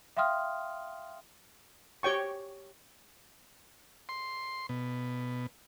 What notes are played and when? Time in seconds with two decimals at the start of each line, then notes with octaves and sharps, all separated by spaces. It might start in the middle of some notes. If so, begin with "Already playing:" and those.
0.17 E5 F5 G5 C6 D#6 F6
2.03 G4 C#5 G5 C#6
4.09 C6
4.69 B2